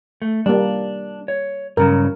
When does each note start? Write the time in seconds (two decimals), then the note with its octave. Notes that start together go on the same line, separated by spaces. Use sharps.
0.22 A3
0.46 G3 A#3 D4
1.28 C#5
1.77 G2 C#3 F#3 A#4